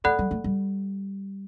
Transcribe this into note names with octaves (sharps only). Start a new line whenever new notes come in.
A3 A4 D5 F#5 B5 F#6
G3
A3
G3